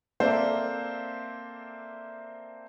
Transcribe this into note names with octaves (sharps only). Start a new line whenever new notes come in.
A#3 C4 A4 C5 D5 E5